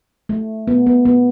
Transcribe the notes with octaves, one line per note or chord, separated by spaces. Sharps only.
A3
B3
B3
B3